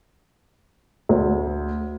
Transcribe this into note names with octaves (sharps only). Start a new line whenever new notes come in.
D2